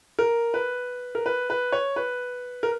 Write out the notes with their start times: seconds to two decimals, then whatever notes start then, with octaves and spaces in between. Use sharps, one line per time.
0.19 A#4
0.54 B4
1.15 A#4
1.26 B4
1.50 B4
1.72 C#5
1.96 B4
2.63 A#4